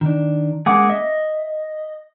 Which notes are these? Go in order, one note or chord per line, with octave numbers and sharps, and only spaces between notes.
D#3 D4
G#3 A#3 C#4 G#4 F#5 D6
D#5 E5